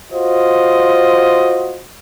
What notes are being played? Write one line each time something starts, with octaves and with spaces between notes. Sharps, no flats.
F4 F#4 C5 D#5